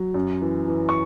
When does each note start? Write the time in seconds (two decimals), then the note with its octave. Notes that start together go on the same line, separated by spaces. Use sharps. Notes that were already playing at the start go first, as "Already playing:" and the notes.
Already playing: F#3
0.14 F#2
0.41 E3
0.68 E3
0.89 C#6